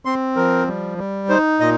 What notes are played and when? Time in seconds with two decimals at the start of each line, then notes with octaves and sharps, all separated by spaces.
0.05 C4 C6
0.36 F3 A#4
0.67 G3
0.98 G3
1.29 D#4 C5
1.60 A#2 D#5